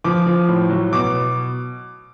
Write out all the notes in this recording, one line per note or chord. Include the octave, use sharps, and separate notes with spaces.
F3 D6
F3
A2
F#3
B2 D6